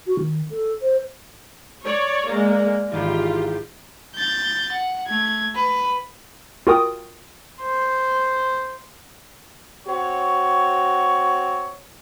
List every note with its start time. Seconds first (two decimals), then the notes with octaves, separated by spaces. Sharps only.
0.07 F#4
0.20 D#3
0.50 A4
0.82 C5
1.85 C#5 D5
2.28 G#3 A#3 D5 A#5
2.92 G#1 G#2 E3 F4 G4
4.15 G6 A6
4.72 F#5
5.08 A3 G#6
5.55 B4
6.67 F4 F#4 A#4 G5 D#6
7.61 C5
9.87 C4 F#4 C#5